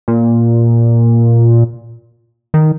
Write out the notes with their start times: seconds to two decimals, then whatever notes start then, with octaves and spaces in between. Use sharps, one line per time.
0.08 A#2
2.54 D#3